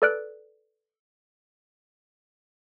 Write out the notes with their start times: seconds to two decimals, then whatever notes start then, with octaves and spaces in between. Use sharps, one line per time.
0.02 A4 B4 D5 F6 F#6 D7